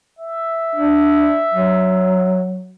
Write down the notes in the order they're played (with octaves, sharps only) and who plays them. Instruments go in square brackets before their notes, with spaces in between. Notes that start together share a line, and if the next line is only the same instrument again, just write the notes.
[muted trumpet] E5
[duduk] D4
F#3